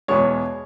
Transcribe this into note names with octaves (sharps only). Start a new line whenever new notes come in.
E2 B2 G#3 C#5